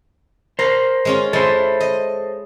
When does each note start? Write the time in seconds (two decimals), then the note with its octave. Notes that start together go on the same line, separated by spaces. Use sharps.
0.59 A#4 C5 F5
1.05 G#3 C#4 F4
1.33 G#3 E4 A4 C5
1.80 D#5